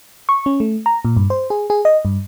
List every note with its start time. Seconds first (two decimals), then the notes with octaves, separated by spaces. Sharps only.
0.29 C#6
0.46 C#4
0.60 A3
0.86 A#5
1.05 A#2
1.17 G2
1.30 C5
1.50 G#4
1.70 G#4
1.85 D#5
2.05 G2